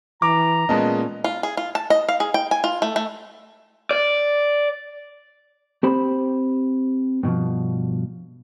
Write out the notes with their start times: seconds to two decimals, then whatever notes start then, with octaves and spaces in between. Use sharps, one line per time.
0.22 E3 A#5 D6
0.69 A#2 G#3 B3 C#4 D#5 A5
1.24 F4
1.43 G#4
1.57 F4
1.75 A5
1.90 D#5
2.09 F5
2.20 G#4
2.34 G5
2.51 G#5
2.64 F4
2.82 A3
2.96 A3
3.91 D5
5.83 C4 G4 C5 B5
7.23 G2 B2 E3 F3